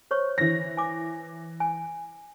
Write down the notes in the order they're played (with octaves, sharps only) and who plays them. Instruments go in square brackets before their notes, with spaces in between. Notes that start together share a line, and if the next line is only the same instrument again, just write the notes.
[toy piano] C5 C#5 C#6
[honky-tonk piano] E3 A#6
[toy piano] G#5 D6
G#5